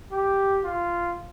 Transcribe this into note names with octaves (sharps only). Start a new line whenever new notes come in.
G4
F4